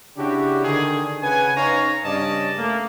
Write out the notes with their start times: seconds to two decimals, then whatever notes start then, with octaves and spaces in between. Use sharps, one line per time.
0.18 C#3 D4 E4 F#4 G4
0.64 D3 D#3 G#4
1.23 C#3 B4 F#5 G#5
1.56 C#4 D#4 C5 C#5 F5 A#5
2.05 G2 C#3 C#4 D5 D#5 A5
2.58 A3 A#3